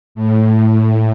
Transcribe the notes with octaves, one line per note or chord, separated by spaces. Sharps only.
A2